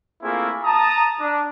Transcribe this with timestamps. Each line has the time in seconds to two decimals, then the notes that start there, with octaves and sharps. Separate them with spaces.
0.22 A3 A#3 C4 E4 F4 G#4
0.64 A5 A#5 D#6
1.20 D4